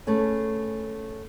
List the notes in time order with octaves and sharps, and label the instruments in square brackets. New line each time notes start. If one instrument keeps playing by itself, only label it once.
[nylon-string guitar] A3 C#4 G#4 B4